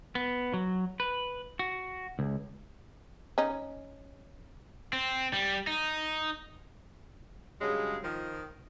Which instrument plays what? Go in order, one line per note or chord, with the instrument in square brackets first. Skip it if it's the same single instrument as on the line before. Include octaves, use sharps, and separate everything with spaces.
[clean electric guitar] B3
F#3
B4
F#4
C#2
[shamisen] C#4 D#4
[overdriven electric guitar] C4
G3
D#4
[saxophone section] G2 C#3 F#3 G#3
D#3 F3